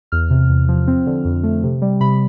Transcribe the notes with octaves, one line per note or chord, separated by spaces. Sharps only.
E2 F6
C3
E2
F3
C4
D3
F2
A3
C3
G3
C3 B5